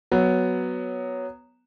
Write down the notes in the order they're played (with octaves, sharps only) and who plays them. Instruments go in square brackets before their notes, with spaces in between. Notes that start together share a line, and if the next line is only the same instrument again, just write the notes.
[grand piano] F#3 B3